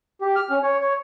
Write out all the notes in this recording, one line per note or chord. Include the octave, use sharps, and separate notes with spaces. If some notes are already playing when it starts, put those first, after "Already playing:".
G4
F6
C#4
C#5
C#5